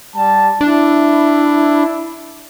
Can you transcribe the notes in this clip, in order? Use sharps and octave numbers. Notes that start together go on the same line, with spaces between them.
G3 A5
D4 E4